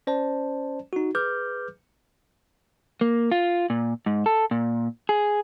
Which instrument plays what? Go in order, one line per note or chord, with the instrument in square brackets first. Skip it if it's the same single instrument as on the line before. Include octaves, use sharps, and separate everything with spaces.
[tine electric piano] C#4 C5 D5 A5
D#4 F#4
G#4 B4 D6 F6 G6
[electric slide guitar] A#3
F4
A#2
G#2
A4
A#2
G#4